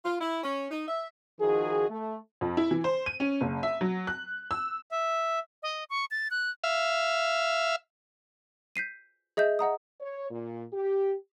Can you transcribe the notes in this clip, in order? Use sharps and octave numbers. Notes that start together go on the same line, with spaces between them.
F4
E4
C#4
D#4
E5
D#3 F3 D#4 F#4 G#4
A3
F2
E4
E3
C5
D#7
C#4
F#1
E5
F#3
F#6
E6
E5
D#5
C#6
A6
F#6
E5 F5
G6 B6 C7 D#7
G#4 D#5 E5 G6
D#5 F#5 A#5 D#6
C#5
A#2
G4